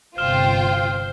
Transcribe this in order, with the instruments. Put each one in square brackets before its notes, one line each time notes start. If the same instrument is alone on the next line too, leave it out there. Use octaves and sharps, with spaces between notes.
[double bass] G1 C3 [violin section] F4 G5 [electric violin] C5 [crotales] F6 E7 G7